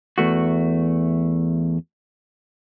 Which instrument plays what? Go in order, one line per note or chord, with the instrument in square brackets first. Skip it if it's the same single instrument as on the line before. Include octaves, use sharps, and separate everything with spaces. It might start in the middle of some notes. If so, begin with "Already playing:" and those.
[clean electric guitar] E2 A3 F#4